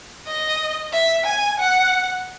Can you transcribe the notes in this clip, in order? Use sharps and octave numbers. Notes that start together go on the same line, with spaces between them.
D#5
E5
G#5
F#5